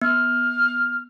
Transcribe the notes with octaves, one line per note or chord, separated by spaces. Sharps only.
B3 F6